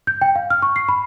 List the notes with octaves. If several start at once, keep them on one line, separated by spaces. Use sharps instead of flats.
G6
G5
F5
F6
C#6
C7
B5